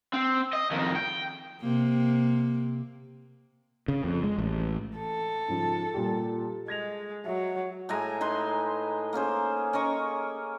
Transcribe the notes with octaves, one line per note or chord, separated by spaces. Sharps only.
C4
D#5
F2 D#3
G5
C3 A#3
C#3
F2
G#3
A1
A4
G#2 C#3 F3
A#2 G3 G4
G#3 G#6 A#6 F7
F#3 E5
A2 G#3 G#5 A#5
D#4 B4 C6
A#3 C#4 G#4 C5
C#4 A#4 D#5 C#6